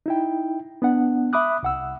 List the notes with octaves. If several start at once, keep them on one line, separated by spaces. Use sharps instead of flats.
D#4 E4 G5
B3 D4 F#5
E5 B5 D6 D#6 F#6
C2 F#5 E6